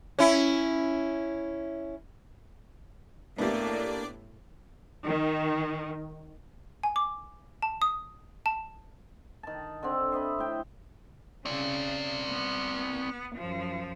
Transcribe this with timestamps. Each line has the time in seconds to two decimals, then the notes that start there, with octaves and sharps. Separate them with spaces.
0.19 C#4 E4
3.38 A2 A#3 B3 D4 E4 G4 D5
5.05 D#3
6.83 G#5
6.96 D6
7.62 A5
7.82 D#6
8.46 A5
9.43 D#3 A5
9.83 D3 C4
10.12 C5 D#5 E5 B5
10.38 A2 G5
11.45 C#3 C4 D5
12.30 B3
13.36 F#2 F3